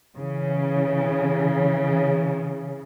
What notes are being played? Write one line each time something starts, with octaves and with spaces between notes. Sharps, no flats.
C#3 E3